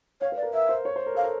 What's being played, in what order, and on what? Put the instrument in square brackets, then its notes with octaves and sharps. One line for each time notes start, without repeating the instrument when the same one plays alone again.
[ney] C#5 [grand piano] F5
[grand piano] B4
[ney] D5
[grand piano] A#4
[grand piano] A#4 [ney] E5
[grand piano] C5
C#5
C5
A#4
[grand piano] A4 [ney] F5
[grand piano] A#4